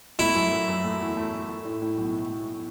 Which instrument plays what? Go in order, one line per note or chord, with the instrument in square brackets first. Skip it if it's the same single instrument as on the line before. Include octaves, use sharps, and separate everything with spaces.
[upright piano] A3 [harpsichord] E4
[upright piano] F#2
F#2
F#2
A3
E2
A3
A3
A3
A2
A2
B1